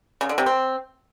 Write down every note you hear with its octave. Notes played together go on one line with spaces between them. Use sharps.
C#3
D3
C3
C4